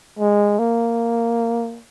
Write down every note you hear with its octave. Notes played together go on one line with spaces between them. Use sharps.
G#3
A#3